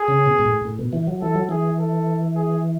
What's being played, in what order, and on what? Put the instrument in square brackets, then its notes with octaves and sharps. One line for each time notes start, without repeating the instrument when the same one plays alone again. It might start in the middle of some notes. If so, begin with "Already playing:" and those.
Already playing: [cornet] G#4
[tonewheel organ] C#3
B2
G#2
A2
A2
B2
E3
F#3
[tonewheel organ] E3 [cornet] A4
[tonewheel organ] F#3
[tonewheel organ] E3 [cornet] G#4
[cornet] A4
G#4